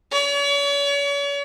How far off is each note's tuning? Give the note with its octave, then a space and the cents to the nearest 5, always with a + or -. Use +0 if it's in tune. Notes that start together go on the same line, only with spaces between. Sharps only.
C#5 +40